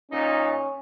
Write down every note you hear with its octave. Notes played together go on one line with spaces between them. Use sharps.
A#2 C#4 D#4